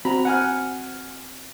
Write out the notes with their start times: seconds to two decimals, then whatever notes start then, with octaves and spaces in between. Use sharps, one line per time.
0.05 C4 F#4 A#5 B5
0.25 F#5 G#5 F6